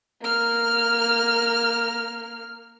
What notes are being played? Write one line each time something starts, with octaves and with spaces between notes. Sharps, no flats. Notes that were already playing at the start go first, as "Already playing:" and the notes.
A#3 F6